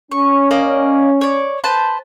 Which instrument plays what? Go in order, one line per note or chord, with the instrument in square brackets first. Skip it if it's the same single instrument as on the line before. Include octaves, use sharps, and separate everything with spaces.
[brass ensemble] C#4 [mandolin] C#6
[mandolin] A#3 D5 D#5
C#5 D5
B4 C5 A5